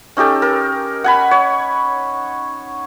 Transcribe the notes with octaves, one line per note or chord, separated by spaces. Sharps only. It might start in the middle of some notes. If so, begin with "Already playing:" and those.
C#4 D#4 G4 A4
A#4
F#5 G#5 B5
C#5